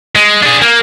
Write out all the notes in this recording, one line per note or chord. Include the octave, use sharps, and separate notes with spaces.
G#3
D4 G#4
A#3